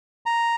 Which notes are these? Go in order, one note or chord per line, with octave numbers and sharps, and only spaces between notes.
A#5